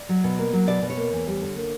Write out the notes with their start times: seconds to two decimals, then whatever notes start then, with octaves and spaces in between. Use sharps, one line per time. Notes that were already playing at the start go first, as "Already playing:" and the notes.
Already playing: D5
0.09 F#3
0.24 B2
0.39 A#3
0.53 F#3
0.67 B2 D5
0.82 B2
0.90 C#5
0.97 A#3
1.13 E2
1.27 G3
1.42 D3
1.56 A#3